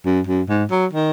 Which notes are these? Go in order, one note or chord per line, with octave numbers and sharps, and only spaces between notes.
F#2
F#2
G#2
F#3
D#3